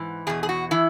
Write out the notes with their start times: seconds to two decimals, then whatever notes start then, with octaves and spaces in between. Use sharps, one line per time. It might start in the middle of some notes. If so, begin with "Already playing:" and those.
Already playing: G#2 E3
0.27 E2 B2 G#4
0.43 G#4
0.49 F#4
0.71 E3 E4